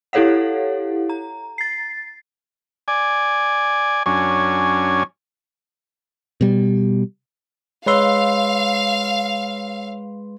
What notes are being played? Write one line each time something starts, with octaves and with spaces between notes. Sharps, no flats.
E4 G4 A4 C#5 F5 F#5
A#5
A6 C7
D5 G#5
F#2 C#4 D4 G#5
B2 G3
G#3 B4 C#5 F5 C6 E6